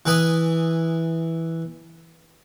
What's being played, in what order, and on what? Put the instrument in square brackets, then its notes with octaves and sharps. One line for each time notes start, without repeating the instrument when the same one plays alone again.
[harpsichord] E3 B4 G#5 D#6